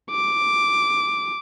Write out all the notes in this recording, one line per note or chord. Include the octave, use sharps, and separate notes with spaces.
D6